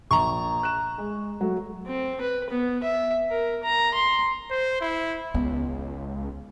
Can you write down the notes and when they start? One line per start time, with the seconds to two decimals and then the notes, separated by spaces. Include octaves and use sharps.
0.11 A#1 A#5 C#6
0.63 F#6 E7
0.98 G#3
1.41 F#3 A3
1.87 C4
2.21 B4
2.50 B3
2.84 E5
3.31 A#4
3.64 A#5
3.95 C6
4.50 C5
4.81 E4
5.34 C#2 B3